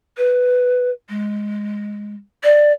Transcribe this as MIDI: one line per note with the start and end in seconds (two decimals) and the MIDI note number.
0.17 0.90 71
1.09 2.15 56
2.43 2.72 74